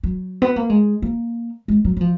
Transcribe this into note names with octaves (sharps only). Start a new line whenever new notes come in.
F#3
B3
A#3
G#3
A#3
G#3
F#3
F#3
F3